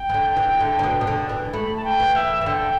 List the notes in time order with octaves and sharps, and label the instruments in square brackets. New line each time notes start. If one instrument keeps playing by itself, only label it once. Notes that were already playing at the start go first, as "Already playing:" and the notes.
Already playing: [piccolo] G5
[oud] E3
D3
E3
D3
D3
B2
B2
D3
E3
[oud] A3 [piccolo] B5
[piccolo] A5
G5
[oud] E3
[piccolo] E5
[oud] E3
[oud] D3 [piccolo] G5